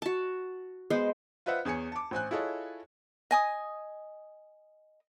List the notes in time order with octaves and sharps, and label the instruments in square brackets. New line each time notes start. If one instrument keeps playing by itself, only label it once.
[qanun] F#4 A5
G#3 B3 C5
[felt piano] F4 B4 C5 D#5 E5 F#5
E2 G#4 C#5 G#5 C#7
A5 D6
A1 C5 G#5 F#6
E4 F4 G#4 A4 C#5 D#5
[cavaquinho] D#5 G#5 D#6